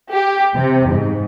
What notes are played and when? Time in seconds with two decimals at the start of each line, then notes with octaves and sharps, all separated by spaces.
0.11 G4
0.54 C3
0.89 G#2